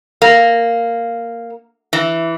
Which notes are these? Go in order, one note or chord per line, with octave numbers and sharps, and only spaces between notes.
A#3
E3